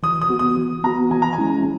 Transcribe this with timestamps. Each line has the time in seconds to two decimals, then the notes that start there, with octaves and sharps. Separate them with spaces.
0.03 E3 D#6
0.22 D#6
0.29 B3 F#4
0.39 D#6
0.57 E3
0.84 B3 F#4 A#5
1.11 E3 G#5
1.22 A#5
1.33 G#5
1.38 G#3 C#4 E4